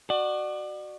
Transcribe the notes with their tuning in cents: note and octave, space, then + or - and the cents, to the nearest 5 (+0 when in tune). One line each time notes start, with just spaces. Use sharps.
F#4 +10 D5 +35